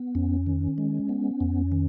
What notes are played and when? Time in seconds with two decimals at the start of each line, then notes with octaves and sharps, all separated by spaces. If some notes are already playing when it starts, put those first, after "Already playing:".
Already playing: B3
0.15 F2 C#4
0.47 D#3
0.78 G#3
1.09 B3
1.41 F2
1.72 D#3